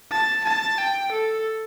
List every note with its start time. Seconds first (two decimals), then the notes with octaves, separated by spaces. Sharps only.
0.11 A5
0.44 A5
0.78 G5
1.12 A4